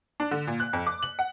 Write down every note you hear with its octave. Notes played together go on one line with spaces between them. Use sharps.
D4
D3
A#2
F#6
F2
D6
F#7
F#5